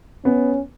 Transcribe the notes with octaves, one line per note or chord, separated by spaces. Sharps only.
B3 C#4